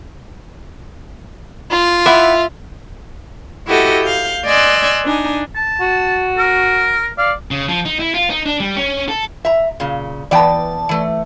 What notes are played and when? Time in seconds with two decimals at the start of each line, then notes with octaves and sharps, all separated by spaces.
1.71 F4
2.06 E4 E5 F#5 D6
3.67 E4 F#4 G4 A4 D#5 F#5
4.02 F5 G6
4.46 D5 D#5 G#5 C6 E6 F#6
5.06 D4 D#4 G#5
5.56 A5
5.81 F#4
6.37 A#4
7.18 D5 F5
7.51 C#3
7.68 F3
7.85 D#4
7.99 E4
8.14 F4
8.30 D#4
8.46 D4
8.60 G3
8.76 C#4
9.09 A4
9.45 E5 A#5
9.80 A#2 C#3
10.31 E3 B3 D5 G5 A5
10.89 E3 A3